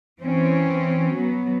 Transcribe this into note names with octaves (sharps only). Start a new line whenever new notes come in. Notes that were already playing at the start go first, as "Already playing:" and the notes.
E3 C4 C#4
F#3 B3